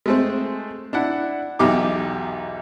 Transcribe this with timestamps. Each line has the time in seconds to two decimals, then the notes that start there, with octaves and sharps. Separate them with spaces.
0.06 G#3 A3 C4
0.93 D4 E4 F#5
1.59 B1 E2 D#4 G4 D6